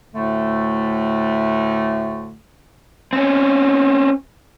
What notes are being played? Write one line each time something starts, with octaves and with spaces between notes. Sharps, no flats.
D2 A2 D3 A3
C4 C#4